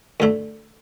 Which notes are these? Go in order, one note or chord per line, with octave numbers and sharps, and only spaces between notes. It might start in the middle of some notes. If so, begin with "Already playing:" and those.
D2 D3 A3 E4